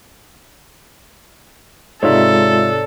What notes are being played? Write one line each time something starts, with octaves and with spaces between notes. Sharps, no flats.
G#2 C3 G#3 F4 A4 C#5 D5 E5